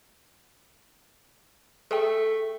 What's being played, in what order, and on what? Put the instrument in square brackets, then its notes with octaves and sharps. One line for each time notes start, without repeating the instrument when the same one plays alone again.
[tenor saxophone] A3 [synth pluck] G#4 A4 G5